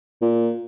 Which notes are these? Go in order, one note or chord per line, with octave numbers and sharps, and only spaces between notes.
A#2